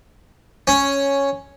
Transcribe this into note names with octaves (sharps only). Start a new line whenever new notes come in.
C#4